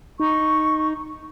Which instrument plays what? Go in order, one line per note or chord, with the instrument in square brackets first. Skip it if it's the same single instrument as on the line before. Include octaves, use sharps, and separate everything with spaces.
[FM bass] D#4 [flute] C#6